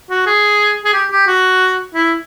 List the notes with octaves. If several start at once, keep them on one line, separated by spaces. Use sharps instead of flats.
F#4
G#4
G#4
G4
G4
F#4
E4